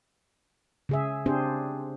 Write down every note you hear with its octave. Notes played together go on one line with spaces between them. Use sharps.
C#3 G#4 E5
C4 D4 G4 G#4 C5